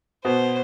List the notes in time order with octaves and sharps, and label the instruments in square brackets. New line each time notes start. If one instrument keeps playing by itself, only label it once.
[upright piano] B2 B3 [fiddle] C5